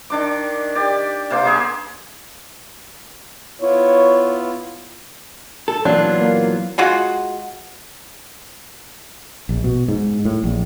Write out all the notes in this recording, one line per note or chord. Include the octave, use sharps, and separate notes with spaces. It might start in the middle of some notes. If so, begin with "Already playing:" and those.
D#3 D4 D6
G4 D5
C3 A#3 C5 D6
A#3 G#4 G#5
B3 E4 F4 C#5
A4
A#2 E3 F#3 B3 D4 F4
A#3
G#3 F4 F#4
A#1
B2
G#2
A2
A#1